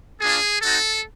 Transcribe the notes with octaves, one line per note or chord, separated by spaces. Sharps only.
A#3 D4 F4 G#4
C4 D#4 F#4 A4